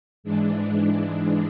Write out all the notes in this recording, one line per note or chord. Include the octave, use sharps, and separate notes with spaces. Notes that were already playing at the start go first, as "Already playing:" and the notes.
G#2 E3 G#3 D4